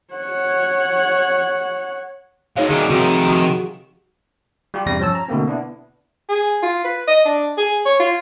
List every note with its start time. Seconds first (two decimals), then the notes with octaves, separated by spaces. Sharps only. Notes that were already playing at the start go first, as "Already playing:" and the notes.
0.14 C#5 F#5
2.56 B2 G#3 D#4 C#5 F5
2.69 D#3 G3 G#4
2.90 C3 D#3 F3 F#4
3.26 F#4 G4
4.74 G3 F4 G4
4.86 E2 G2 C3 G3 A#6
5.00 F3 C#4 C#5 A5 E6
5.15 A#5
5.28 B2 D3 A3 A#3 C4
5.48 B3 D4 E4
6.29 G#4
6.63 F4
6.84 B4
7.07 D#5
7.25 D4
7.58 G#4
7.86 C#5
8.00 F4